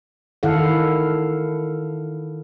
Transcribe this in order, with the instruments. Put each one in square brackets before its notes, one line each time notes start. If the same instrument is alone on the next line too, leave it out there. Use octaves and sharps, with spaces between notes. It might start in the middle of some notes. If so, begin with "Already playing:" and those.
[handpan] D#3 E4 A4 F5 F#5